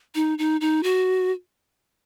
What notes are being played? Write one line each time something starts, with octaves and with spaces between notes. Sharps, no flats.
D#4
D#4
D#4
F#4